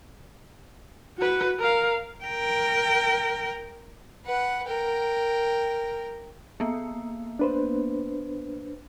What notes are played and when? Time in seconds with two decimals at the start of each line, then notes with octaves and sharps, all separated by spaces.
1.18 F#4 B4
1.59 A#4 F5
2.24 A#4 G5
4.26 B4 F#5
4.67 A#4 G5
6.60 A#3 B3
7.39 D4 B4 C5